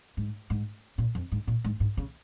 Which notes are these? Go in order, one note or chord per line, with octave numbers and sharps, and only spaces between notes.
G#2
G#2
A#2
F2
G#2
A#2
G#2
G#2
C#3